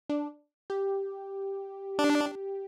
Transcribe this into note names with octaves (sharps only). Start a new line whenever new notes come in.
D4
G4
D4